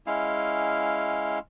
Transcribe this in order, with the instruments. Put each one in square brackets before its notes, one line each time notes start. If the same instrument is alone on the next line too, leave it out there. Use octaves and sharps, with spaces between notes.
[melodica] G#3 C#4 E4 F5